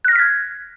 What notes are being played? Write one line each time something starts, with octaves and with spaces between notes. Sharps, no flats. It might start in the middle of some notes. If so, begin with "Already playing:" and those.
F6 F#6 G#6 A#6 B6